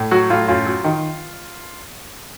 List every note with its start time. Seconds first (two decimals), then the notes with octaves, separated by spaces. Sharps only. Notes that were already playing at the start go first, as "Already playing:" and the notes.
Already playing: A2
0.11 F#3 F#4
0.30 A2 F4
0.48 F#2 F4
0.66 F#3
0.84 D#3